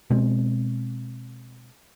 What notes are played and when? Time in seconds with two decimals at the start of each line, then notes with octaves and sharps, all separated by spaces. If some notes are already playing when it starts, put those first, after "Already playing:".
0.10 B2 G#3 C4